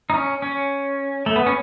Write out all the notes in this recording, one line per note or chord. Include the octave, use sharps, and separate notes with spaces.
D#4
C#4
C#4
A3
B3
C#4